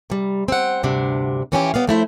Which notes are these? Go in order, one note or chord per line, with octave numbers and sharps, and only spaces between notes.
C3 G3
C4 F#5
D2 G2 C3 D4
E3 F3 C#4 E4 F4 G4
G3 B3 D5 F5
F3 A3 E4 C5